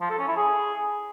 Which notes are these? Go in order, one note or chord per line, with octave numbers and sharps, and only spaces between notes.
F3
A4
C#4
E4
G#4